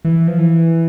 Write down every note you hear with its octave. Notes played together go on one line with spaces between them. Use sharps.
E3
F3
E3